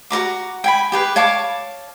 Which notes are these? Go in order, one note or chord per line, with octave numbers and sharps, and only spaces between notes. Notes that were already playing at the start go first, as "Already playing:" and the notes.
F#4 A#4 A#5 D6
G5 G#5 B5
G4 G#4 B4
C#5 F5 A5 D6